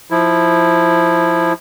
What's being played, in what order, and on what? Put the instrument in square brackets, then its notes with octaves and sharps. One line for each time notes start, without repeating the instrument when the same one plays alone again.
[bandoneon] F3 E4